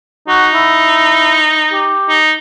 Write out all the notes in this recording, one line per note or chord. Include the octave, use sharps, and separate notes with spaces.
D#4 F#4
E4
G4
D#4